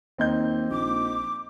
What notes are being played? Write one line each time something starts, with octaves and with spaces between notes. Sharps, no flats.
D#2 C4 D#4 G6
A#1 D6